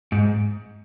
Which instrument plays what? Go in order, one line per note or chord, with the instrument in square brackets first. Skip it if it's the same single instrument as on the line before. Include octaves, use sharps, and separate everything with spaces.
[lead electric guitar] G#2